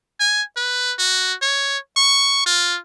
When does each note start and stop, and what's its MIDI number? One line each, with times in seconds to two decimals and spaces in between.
0.20 0.43 80
0.57 0.93 71
0.99 1.34 66
1.42 1.78 73
1.97 2.44 85
2.46 2.78 65